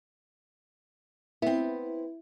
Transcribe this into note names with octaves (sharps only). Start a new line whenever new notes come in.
B3 C4 E4